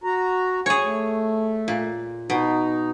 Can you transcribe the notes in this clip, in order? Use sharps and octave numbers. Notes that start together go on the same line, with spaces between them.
F#4 A#5
G#4 C#5 G#5
A3
A#2
B2 D#4